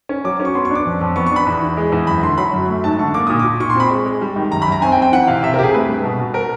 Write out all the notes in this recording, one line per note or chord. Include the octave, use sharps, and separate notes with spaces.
C#4
F#3 D6
C#4
C#6
B3 C6
C#6
D4
D6
F2
F2
B3 C#6
C#6
D4 B5
E2
E3
G#3
E2
F#2 B5
D3 C6
F#3 B5
F#2
A3
G#2 A5
D3 C#6
A#3 D6
A#2 D#6
A#2 D6
A#2 C#6
C6
C4 B5
G#3
G#3
G3
D#3
F#2 A#5
B5
F#2
A#5
C4 G#5
G5
C4
G5
E3 F#5
C3 F5
C3 E5
A#4
C3 G4 G#4
A3 B4
G2
B2
B2
A#4